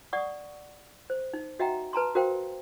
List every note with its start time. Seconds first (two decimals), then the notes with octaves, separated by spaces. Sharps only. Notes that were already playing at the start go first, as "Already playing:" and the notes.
0.13 D5 F#5 C#6 D#6
1.10 C5
1.33 D#4
1.59 F#4 D#5 E5 F#5 G5 A#5
1.93 B4 A5 A#5 C6
2.15 F#4 A#4 C5 F5 G5